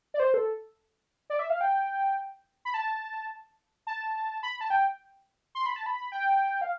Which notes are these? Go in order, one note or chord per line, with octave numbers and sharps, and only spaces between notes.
D5
C5
A4
D5
E5
F5
G5
B5
A5
A5
B5
A5
G5
C6
B5
A5
B5
G5
F5